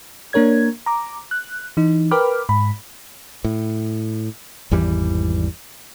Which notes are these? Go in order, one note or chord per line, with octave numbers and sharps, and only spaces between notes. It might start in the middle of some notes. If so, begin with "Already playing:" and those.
A#3 D4 A#4 C#5 G#6
A#5 D6
F#6
E3 D#4
A#4 B4 G5 B5 D6 F6
G#2 B5
A2
G#1 E2 E3 G3